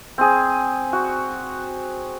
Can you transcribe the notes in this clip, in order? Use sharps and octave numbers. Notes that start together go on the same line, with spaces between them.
C4 G#4
F#4